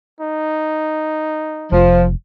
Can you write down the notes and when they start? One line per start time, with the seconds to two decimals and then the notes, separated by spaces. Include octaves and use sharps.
0.21 D#4
1.72 F1 F3